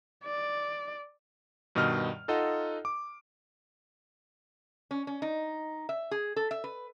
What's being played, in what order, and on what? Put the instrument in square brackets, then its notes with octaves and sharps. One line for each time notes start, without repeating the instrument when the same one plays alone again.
[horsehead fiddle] D5
[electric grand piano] G2 B2 D#3 D#5 F6
D#4 F4 A4 D#5 F#5
D6
[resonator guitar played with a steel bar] C#4
C#4
D#4
E5
G#4
A4
E5
B4